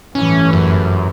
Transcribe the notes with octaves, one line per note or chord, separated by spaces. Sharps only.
G1 A2 E3 C#4
F#2